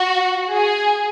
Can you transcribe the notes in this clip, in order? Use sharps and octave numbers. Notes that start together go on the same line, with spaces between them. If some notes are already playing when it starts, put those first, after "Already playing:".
Already playing: F#4
G#4